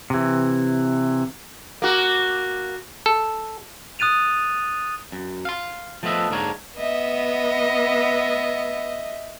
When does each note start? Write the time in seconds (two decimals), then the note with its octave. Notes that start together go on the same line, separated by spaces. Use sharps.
0.10 C3 E3
1.82 A#3 F#4
3.06 A4
3.99 D#6 F#6 A6 D#7 F7
5.12 F#2
5.45 F5 C6
6.03 F3 A3 B3 F4 D#5 E5
6.30 G#2 D3 A#3 A#4 C#5
6.77 B3 D#5 E5